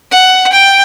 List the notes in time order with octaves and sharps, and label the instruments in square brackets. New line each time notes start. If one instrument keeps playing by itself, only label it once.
[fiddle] F#5
G5